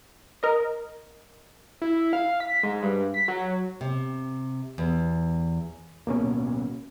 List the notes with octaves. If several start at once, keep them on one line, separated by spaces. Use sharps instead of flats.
A#4 D#5
E4
F5
B6
G#2
G2
B6
F#3
C3
E2
D1 B2 A#3 C#4